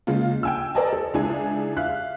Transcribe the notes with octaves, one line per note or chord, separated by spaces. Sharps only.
C#3 G#3 A#3 F4
G5 G#5 E6
A#4 C5 D5 D#5 G#5 A5
A4
C#2 D4 E4 G#4 G#5
E5 F5 F#6